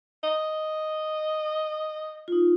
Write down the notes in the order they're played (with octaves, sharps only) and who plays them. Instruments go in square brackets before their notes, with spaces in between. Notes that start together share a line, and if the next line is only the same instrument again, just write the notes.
[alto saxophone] D#5
[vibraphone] D#4 F4